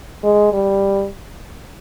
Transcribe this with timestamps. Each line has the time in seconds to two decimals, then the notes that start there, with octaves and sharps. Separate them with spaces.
0.23 G#3
0.53 G3